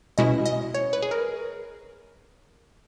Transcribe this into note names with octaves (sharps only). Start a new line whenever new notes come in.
B2 G#3 C#4 E4 D#5
D#5
C#5
B4
G#4
A#4